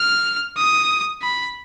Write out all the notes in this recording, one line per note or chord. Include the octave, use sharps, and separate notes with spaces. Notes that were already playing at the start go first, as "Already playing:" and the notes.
Already playing: F6
D#6
B5